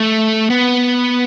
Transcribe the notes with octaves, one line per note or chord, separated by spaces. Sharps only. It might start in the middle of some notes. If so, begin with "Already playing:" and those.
Already playing: A3
B3